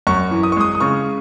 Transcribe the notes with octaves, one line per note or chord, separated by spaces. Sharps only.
F#2 C#6
E3
D#6
C#6
G#3 D#6
D#6
C#3 C#6